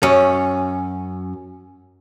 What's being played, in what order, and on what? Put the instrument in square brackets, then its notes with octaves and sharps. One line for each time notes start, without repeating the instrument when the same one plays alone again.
[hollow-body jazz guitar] F#2 C#4